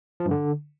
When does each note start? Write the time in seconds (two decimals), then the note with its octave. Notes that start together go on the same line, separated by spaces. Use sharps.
0.20 F3
0.26 G2
0.31 D3